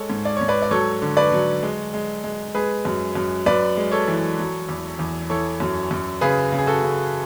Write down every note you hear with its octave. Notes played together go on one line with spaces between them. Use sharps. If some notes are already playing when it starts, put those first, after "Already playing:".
Already playing: G#3 A4 C#5
G#2
D5
G#2 C#5
B4 D5
D5
F#3 A4 C#5
D3
B4 D5
F#3
G#3
G#3
G#3
G#3 G#4 B4
F#2
F#2
F#2 B4 D5
G#3
A4 C#5
E3
F#3
E2
E2
E3 A4 C#5
F#2
F#2
C#3 G#4 B4
C#3
G#4
F#4 A4
C#3